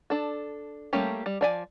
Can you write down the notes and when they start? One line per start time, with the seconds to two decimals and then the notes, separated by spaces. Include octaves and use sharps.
0.10 D4 A4
0.93 G3 A3 A#3 C#4 G4
1.26 G3
1.41 F3 D5 G#5